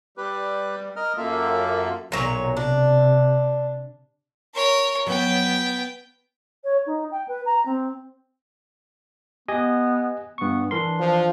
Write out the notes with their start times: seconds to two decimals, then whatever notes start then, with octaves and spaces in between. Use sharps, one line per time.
0.17 G3 G4 B4
0.96 A#4 D#5 F6
1.17 F#2 A#3 F4 A4 E5
2.12 B1 A#2 F#3 C#5
2.57 C3 D4
4.54 A#4 C#5
5.07 F#3 B3 G5
6.64 C#5
6.86 D#4
7.12 G5
7.28 B4
7.46 A#5
7.66 C4
9.48 B3 G4 D#5 G#5
10.38 G2 B3 C#6
10.71 E3 D4 A#4 C6
11.00 F3